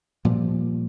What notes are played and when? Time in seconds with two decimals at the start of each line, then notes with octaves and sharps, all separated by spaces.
0.25 A#2 F3 G3